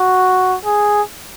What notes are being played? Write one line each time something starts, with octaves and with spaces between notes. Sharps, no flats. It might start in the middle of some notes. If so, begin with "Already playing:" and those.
Already playing: F#4
G#4